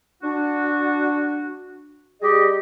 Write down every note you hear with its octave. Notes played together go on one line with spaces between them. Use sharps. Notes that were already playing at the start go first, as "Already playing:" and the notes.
D4 F#4
G3 G4 G#4 D#5